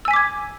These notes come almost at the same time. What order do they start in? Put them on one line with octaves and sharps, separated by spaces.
E6 G#5 B6 D6 G#6